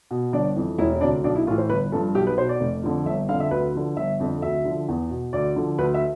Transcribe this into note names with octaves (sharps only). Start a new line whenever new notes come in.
B2
G1 D4
F2 E3
E1 E4
D2 C3 D4
B1 D4
E4
A2 E3 F4
C5
G1 B4
G2 F3 A4
B1 G4
B4
B2 C5
D5
F1
F2 D3 F3
G1 E5
F2 D3 F5
E5
D2 B4
D3 F3
G1 E5
F2 D3
D2 E5
D3 F3
E2
B2
D2 D5
D3 F3
D2 B4
E5